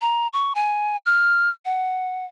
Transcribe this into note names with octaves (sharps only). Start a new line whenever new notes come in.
A#5
C#6
G#5
F6
F#5